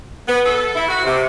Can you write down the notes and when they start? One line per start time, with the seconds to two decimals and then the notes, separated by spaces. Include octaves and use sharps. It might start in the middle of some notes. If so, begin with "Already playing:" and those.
0.28 B3
0.45 A4
0.75 E4
0.88 F#4
1.04 C3